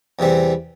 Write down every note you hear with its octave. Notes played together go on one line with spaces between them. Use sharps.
E2 C3 E3 G3 C4